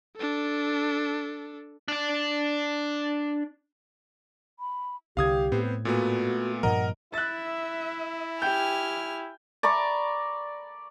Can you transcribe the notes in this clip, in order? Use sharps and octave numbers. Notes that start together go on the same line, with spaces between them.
D4 A4
D4 D5
B5
C2 D3 G4 F5 D#6 G#6
A2 B3 C4 C5
A#2 A3 B3 F#4
G2 A#2 F3 A#4 D#5 F#5 A#5
E4 E5 F#6 A6
G4 G5 G#5 F6 G6
D5 A#5 B5 C#6